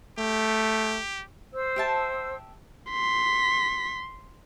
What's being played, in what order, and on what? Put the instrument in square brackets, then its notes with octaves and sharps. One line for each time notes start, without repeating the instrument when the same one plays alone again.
[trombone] A3 [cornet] G4
[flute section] C5 E6
[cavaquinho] G4 E5 A5
[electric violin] C6 B6